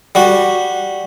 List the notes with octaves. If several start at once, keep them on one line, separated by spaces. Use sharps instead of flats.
G3 F#4